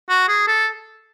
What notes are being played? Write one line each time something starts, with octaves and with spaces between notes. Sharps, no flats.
F#4
G#4
A4